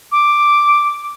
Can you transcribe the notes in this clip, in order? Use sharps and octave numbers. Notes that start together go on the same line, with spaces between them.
D6